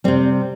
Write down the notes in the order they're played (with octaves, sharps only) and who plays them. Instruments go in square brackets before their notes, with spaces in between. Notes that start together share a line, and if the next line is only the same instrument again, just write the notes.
[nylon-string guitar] C3 G3 C4